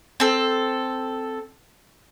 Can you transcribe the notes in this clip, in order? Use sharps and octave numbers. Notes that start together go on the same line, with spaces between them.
C4 A4